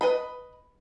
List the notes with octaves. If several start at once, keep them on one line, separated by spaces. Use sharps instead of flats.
B4 D#5 B5